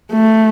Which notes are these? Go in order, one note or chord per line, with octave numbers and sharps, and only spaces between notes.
A3